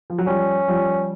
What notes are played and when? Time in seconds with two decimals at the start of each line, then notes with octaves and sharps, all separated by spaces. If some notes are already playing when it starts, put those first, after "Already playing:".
0.10 F3
0.18 F#3
0.27 F3 G3 C#4
0.68 F3 G3